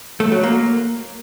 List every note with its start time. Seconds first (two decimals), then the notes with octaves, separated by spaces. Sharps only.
0.20 A3
0.32 F#3
0.43 A#3